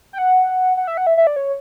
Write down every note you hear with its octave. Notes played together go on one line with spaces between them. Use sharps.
G5
F#5
F#5
E5
F#5
E5
E5
D5
C#5